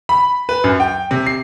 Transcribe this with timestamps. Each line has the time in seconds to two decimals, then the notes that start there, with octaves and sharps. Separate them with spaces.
0.09 B5
0.49 B4
0.64 F#2
0.80 G5
1.11 C3
1.26 C7